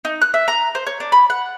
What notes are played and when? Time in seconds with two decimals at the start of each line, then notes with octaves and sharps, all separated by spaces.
0.05 D#4
0.22 F#6
0.34 E5
0.48 A#5
0.75 C5
0.87 C#5
1.00 D4
1.12 B5
1.30 F#5